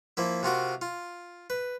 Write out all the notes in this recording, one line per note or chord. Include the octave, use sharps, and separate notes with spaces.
F3 A#3 E4
C3 F4 F#4 A#4
F4
B4